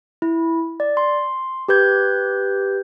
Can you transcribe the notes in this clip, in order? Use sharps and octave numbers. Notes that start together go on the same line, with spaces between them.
E4
D5
C6
G4 B4 G6 G#6